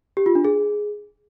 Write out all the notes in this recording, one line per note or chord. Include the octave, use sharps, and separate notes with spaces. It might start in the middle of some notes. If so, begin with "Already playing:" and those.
G4
F4
D4
G#4